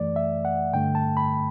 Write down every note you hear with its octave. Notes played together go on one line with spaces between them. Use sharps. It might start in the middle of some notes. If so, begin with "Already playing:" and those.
Already playing: F#2 E3 A3 D5
E5
F#5
G2 D3 A3 G5
A5
B5